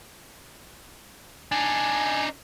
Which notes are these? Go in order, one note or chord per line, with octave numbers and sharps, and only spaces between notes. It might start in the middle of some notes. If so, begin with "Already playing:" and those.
D4 D#4 G#5